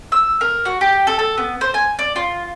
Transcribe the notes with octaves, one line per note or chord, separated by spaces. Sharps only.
E6
A#4
F#4
G4
A4
A4
B3
C5
G#5
D5
F4